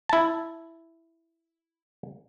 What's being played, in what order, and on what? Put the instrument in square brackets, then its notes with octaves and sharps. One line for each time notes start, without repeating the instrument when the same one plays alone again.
[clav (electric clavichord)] E4 A5